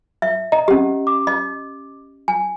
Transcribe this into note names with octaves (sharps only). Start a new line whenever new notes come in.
E5
D#5 A#5
C#4 G4
D6
D#5
G#5